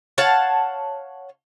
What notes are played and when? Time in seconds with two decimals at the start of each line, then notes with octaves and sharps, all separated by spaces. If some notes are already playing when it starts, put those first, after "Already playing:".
0.18 C#5 F5 F#5 A5